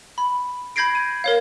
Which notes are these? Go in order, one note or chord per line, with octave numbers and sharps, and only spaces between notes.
B5
B5 G6 G#6 A#6 C7 D7
D#7
A#4 C#5 F5